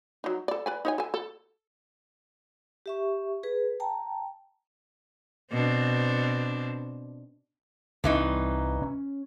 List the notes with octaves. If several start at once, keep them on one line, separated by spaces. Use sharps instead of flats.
F#3 D#4
A4 D5
B4 D5 G#5
D#4 C#5 G#5
A4 G#5
A4
G4 E5 C#6
G#4 B4
G5 A5 A#5
B2 C4 D4
C2 G2 E3 C4 D#4
C#4